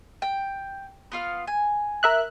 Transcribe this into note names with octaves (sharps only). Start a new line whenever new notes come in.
G5
B3 F4 F5
G#5
A#4 E5 F#6